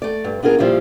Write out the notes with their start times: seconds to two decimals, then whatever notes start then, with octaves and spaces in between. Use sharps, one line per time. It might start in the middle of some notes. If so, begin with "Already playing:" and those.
0.02 A3 D5
0.24 G2
0.43 B3 D4 F4 G#4 A#4
0.59 G2 A#2 F3 G3 E4 F4